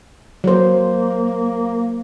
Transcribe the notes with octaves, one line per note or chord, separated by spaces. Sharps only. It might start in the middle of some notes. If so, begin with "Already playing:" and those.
F#3 A#3 C5